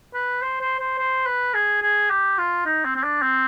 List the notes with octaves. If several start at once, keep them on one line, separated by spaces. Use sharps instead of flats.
B4
C5
C5
C5
C5
B4
G#4
G#4
G4
F4
D#4
C4
C4
D4
C4